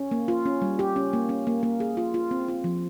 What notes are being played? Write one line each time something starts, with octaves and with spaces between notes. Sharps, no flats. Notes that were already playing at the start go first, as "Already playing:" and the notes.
Already playing: C#4
A#3
F4
C#4
G3
G4
C#4
A#3
C#4
A#3
A#3
G#4
F4
F4
C4
F4
F3